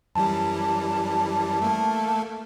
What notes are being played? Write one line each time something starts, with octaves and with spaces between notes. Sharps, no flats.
F#2 E3 G3 A5
A3 A#3